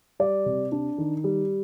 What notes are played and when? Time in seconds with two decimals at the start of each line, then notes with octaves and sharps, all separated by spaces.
0.20 G3 D5
0.46 C3
0.72 D4
0.98 D#3
1.24 G3